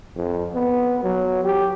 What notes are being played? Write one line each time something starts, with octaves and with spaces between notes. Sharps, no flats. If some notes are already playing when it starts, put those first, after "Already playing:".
F2
B3
F#3
G4